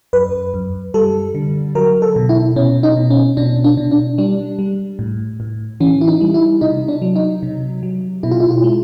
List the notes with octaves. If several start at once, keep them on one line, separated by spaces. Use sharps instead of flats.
F#2 B4
F#2
G3 A4
D3
F#3 A#4
A4
B2
E4
B2 C#4
D#4
B2
C#4
B2 D4
D4
B2
D4
G3 D4
G3
A2
A2
E3 C#4
E4
D#4
G3
E4
C3 D#4
D4
F#3
D#4
C3
F#3
B2 E4
F4
E4
F4
G#3